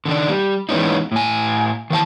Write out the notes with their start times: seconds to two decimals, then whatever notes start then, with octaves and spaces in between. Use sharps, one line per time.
0.05 D3 D#3 D4
0.29 G3
0.69 E3 G#3 B3 C#4 D#4
1.12 A2 G#5
1.90 D#3 E3 F5 A5